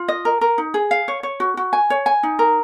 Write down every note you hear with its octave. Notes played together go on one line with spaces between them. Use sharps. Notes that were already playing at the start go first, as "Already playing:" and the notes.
Already playing: F4
D#5
A#4
A#4
D#4
G#4
F5
C#5
C#5
F#4
F#4
G#5
C#5
G#5
D#4
A#4